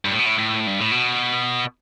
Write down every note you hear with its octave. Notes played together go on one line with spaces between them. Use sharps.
G2
A2
B2
A2
A2
G2
A2
B2